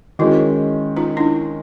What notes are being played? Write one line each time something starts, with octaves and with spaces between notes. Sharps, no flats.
D#3 G#3 C#4 E4 F#4
D#4 F4
D4 E4